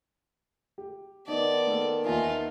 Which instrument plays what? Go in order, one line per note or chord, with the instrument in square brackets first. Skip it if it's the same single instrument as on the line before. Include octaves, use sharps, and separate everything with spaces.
[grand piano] G4
[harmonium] D#3 B3 A5 [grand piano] D#4 [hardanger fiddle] D5
[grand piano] A#3 A4
[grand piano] D#2 E5 G#5 [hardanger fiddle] D#4 F4